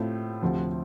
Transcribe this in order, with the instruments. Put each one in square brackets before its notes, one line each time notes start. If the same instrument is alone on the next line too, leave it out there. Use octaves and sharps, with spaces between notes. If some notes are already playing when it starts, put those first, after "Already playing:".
Already playing: [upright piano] A2 A3 C4 F4
D2 C3 F3